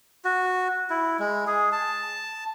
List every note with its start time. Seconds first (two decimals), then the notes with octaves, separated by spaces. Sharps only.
0.25 F#4
0.90 E4
1.20 G#3
1.47 G#4
1.72 A5